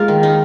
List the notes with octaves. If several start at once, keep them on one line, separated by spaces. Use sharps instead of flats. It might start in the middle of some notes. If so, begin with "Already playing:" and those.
Already playing: G#3 A#3 F4 A#4
D#3
D#4